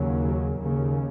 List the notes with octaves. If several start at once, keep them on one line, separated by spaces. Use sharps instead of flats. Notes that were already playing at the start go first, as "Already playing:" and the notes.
Already playing: D#2 C#3 F#3
D#2 C#3